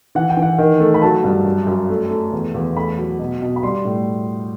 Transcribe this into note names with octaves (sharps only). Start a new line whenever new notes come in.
E3 F#5
G5
E3
F#5
D#3
A3
B5
F#3 A5
G2
F#2
F#2
A3
A3
E2
E2
A3 B5
F#3
B2
B2
B5
G3 C6
A2